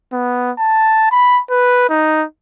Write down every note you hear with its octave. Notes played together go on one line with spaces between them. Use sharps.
B3
A5
B5
B4
D#4